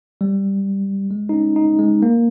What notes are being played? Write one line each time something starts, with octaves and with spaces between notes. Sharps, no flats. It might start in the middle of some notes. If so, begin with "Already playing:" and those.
G3
G#3
D#4
C#4
D#4
G#3
A#3